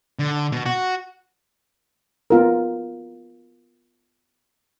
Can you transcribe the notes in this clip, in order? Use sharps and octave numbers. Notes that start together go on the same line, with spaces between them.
D3
B2
F#4
B3 F4 A#4